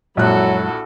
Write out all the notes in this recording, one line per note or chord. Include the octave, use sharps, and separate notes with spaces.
A#1 F#2 F#3 G#3 E4 F#4 A4 F#6